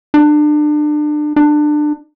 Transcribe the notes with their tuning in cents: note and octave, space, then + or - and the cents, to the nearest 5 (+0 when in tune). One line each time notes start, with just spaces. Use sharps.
D4 +30
D4 +25